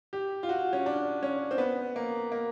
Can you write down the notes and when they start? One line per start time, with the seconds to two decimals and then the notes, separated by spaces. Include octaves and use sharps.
0.13 G4
0.43 F4
0.49 F#4
0.73 C#4
0.86 D4
1.23 C#4
1.51 C4
1.58 B3
1.96 A#3
2.32 A#3